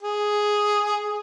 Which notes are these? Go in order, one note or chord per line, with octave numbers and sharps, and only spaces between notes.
G#4